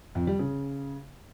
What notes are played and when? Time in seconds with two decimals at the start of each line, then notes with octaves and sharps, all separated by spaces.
0.15 F2
0.27 G3
0.39 C#3